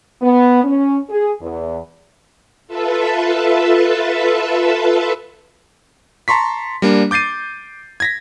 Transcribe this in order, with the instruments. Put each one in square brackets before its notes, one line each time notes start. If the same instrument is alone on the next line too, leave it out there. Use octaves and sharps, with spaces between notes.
[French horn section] B3
C#4
G#4
E2
[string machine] F4 A4 B4 E5 A5
[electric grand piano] A5 A#5 C6 C#6 B6
G3 A#3 D4
D6 G6 A6 C7 D#7
G#6 A#6 B6